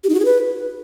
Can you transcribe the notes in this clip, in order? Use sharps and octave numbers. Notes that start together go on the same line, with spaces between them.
G4
D#4
F#4
G#4
B4